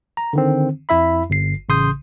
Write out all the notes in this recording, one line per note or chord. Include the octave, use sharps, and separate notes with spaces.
A#5
D3 D#3 C4
F2 E4 E5 B5
G1 C7
A1 C#3 C6 D#6 G6